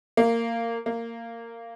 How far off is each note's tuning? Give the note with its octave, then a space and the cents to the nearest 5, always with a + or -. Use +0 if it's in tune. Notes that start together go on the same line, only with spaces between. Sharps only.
A#3 -15
A#3 -15